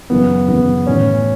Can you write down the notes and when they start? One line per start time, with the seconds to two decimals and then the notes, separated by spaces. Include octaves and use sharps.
0.10 F#2 C#3 E3 B3
0.48 F#2 C#3 E3 B3
0.87 A2 E3 C#4